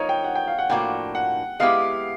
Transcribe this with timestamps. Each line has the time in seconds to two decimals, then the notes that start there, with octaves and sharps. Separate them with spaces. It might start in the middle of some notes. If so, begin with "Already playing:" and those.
Already playing: F3 A#3 D#4 C#5
0.09 G5
0.24 F#5
0.35 G5
0.47 F5
0.58 F#5
0.70 A2 F3 A#3 D4 F#4 G5
1.15 F#5
1.60 G#3 B3 E4 G4 F5